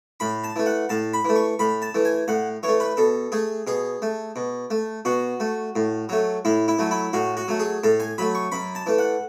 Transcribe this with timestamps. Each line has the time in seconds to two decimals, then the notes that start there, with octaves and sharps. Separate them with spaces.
0.20 A2 B5
0.44 A5
0.56 E3 A3
0.66 F#5
0.89 A2 A5
1.13 B5
1.25 E3 A3
1.36 C#6
1.59 A2 B5
1.82 A5
1.94 E3 A3
2.05 G#5
2.28 A2 F#5
2.63 E3 A3 C#5
2.80 B4
2.97 B2 A4
3.32 A3 G#4
3.67 B2 G#4
4.02 A3
4.36 B2
4.71 A3
5.05 B2 F#4
5.40 A3
5.76 A2
6.09 F#3 A3
6.45 A2 E4
6.68 E4
6.79 F#3 A3
6.91 E4
7.13 A2 F#4
7.37 F#4
7.48 F#3 A3
7.60 G#4
7.84 A2 A4
8.00 G#5
8.18 F#3 A3 B5
8.35 C#6
8.52 F#2 B5
8.75 A5
8.86 E3 A3
8.98 F#5